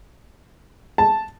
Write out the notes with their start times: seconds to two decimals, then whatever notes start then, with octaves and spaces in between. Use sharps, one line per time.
0.98 A5